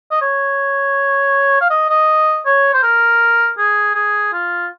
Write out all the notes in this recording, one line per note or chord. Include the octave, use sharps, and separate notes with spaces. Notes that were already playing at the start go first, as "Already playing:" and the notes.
D#5
C#5
F5
D#5
D#5
C#5
C5
A#4
G#4
G#4
F4